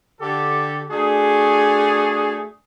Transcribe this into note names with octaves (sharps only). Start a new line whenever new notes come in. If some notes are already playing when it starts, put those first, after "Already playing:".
D3 G4 A4
A3 D4 F#4 G#4